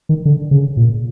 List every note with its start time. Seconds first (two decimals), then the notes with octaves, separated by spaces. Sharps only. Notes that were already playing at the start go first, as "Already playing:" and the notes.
0.09 D#3
0.25 D3
0.51 C#3
0.77 A#2